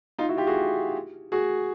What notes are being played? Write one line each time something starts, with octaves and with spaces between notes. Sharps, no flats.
D#4 F4
E4 F#4
F4 G4
F#4 G#4
F#4 G#4